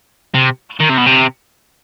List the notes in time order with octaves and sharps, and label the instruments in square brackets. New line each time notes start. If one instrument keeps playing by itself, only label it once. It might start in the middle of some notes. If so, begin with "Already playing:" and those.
[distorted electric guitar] C3
D#3
C3
B2
C3